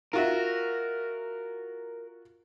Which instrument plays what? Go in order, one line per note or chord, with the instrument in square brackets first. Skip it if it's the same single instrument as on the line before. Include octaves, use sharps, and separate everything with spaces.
[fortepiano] F4 F#4 E5 [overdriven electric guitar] A#4